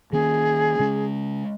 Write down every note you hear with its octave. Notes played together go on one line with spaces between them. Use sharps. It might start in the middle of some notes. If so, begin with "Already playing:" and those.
D#3 A#3 C#4 G#4
C#3 G#3 C#4